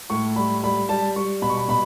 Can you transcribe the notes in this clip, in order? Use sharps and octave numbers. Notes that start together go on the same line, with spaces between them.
A2 C#6
G3 B5
G3 B5
G3 A5
G3 C#6
B2 B5
C#6
B5
B2 B5